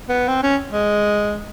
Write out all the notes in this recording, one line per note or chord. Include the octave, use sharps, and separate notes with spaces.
B3
C4
C#4
G#3